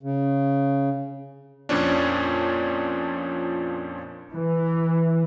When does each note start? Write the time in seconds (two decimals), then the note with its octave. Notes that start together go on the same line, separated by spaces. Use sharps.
0.03 C#3
1.69 F2 A#2 F3 C#4 D4
4.33 E3